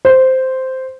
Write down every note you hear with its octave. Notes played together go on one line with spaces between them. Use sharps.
C5